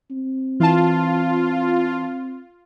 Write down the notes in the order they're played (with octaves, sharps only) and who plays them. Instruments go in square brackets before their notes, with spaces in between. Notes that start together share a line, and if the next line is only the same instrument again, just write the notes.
[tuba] C4
[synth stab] E3 A5 [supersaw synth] F4